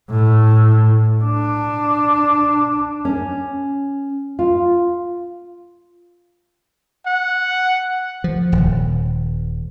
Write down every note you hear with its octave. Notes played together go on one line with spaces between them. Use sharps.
A2
D4
C#4
F4
F#5
F3
D#1